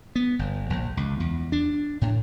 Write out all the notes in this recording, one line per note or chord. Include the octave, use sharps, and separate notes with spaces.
B3
G1
A#1
C#2
E2
D4
A2